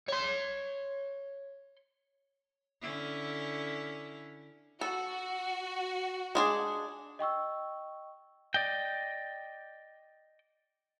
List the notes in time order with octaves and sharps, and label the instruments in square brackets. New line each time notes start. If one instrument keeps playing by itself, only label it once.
[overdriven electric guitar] C#5 C6
[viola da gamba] D3 C#4 E4
[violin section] F#4 [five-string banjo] A4
[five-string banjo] G#3 D4 G#4
[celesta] D#5 G5 C#6 E6
[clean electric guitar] D5 D#5 G5